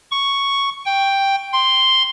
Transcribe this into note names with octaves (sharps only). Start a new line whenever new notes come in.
C#6
G5
C6